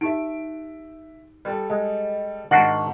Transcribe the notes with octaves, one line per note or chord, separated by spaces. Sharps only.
D#4 G4 E5 D7
G3 A4
G#3
G#2 D#3 D4 F#4 F#5 C7 F#7